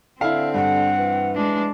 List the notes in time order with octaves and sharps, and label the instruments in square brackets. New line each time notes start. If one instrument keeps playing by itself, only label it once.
[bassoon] D3 [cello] C4 [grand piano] E4 F5
[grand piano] G2 [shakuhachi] F#5
[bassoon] E3
[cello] G#3 D4